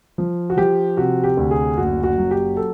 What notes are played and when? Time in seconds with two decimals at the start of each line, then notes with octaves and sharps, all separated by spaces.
0.18 F3
0.50 F#4
0.57 F3 G4
0.97 C3 F#4
1.24 G4
1.37 D2
1.51 G#4
1.77 F#1 F#4
2.03 F#4
2.18 F#3
2.31 G4
2.57 A4